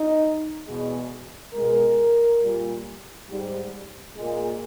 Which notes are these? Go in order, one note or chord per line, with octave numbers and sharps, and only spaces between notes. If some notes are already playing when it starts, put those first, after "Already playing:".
Already playing: D#4
E2 B2 G#3
B2 G#3 A#4
A#2 G3
G#2 G3
A#2 G#3